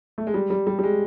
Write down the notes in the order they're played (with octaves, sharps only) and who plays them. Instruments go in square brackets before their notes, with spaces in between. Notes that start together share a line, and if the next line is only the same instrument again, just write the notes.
[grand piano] A3
G#3
G3
G3
G3
G3
G#3